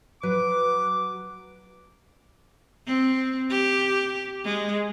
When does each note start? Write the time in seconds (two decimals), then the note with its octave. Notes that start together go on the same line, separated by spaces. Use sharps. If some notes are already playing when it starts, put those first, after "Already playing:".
0.23 F#3 B4 D6
2.87 C4
3.50 G4
4.44 G#3